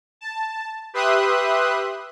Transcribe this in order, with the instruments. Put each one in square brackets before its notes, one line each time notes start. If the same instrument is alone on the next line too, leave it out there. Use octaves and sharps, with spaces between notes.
[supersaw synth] A5
G4 B4 E5 C6 D#6 F#6